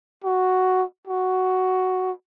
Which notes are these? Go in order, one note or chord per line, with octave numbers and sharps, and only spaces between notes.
F#4
F#4